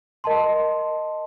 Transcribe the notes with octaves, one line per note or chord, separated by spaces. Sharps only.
A#4 D#5 A5 C6